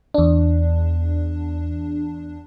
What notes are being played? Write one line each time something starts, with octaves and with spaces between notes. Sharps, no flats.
E2 D4